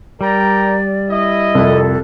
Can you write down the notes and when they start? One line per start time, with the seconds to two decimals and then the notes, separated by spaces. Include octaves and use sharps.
0.21 G3 A#4 D5 G5 A#5
1.10 E4 D#5
1.55 C2 F2 A4